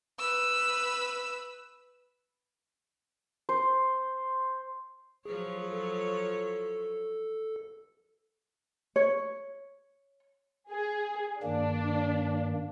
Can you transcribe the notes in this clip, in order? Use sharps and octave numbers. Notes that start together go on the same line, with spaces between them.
B4 E6
C5
F3 F#3 G#4 C#5
A4
C#5
G#4
G2 D#3 A#3 D4